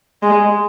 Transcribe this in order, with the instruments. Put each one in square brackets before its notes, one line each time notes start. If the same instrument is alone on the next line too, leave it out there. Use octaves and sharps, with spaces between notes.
[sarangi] G#3